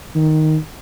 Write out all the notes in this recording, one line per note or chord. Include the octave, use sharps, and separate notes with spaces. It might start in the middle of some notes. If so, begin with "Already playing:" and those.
D#3